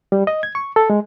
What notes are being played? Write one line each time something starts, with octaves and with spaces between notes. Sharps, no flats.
G3
D#5
G#6
C#6
A4
G#3